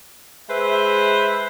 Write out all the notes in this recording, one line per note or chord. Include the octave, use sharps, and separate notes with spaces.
G#3 B4 C5 E5